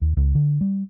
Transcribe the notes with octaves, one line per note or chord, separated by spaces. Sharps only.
D#2
C#2
D3
G3